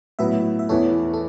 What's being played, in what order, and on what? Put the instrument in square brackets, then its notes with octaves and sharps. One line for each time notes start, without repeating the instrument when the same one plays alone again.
[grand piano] A2 F#3 B3 E4 [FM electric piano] B4 E5
[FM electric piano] E5
[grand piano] E2 E3 B3 E4 [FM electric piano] A4 C#5
[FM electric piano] A4